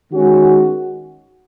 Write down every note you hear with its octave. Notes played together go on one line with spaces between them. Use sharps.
D#3 G#3 C#4 F#4